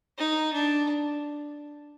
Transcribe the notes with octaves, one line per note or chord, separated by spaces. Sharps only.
D#4
D4